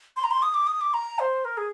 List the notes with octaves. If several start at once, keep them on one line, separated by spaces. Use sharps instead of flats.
C6
A#5
C6
D#6
D6
D#6
D6
A#5
C5
A#4
G#4